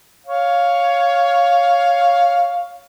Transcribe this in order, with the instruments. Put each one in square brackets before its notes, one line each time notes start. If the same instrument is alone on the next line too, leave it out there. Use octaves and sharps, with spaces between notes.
[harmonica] C#5 F5